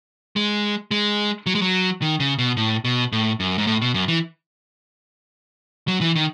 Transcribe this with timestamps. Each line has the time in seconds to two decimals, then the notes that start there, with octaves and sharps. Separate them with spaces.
0.36 G#3
0.91 G#3
1.46 F#3
1.55 G#3
1.62 F#3
2.02 D#3
2.20 C#3
2.39 B2
2.57 A2
2.85 B2
3.12 A2
3.40 F#2
3.58 G#2
3.67 A2
3.82 B2
3.94 F#2
4.08 E3
5.88 F#3
6.01 E3
6.15 D#3